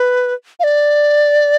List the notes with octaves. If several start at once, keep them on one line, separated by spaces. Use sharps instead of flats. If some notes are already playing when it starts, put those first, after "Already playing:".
Already playing: B4
F5
D5